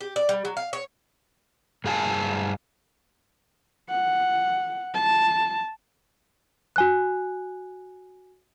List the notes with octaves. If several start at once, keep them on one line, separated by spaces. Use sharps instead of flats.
G4
D5
G3
F#3
F5
C#5
G2 G#4 F5 G#5 A5
F#5
A5
F#4 G#5 F#6